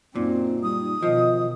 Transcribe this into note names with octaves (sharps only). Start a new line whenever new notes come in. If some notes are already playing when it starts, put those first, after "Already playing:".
F#2 A#2 C4 D#4
G3 D#6
B2 D#3 F3 D#5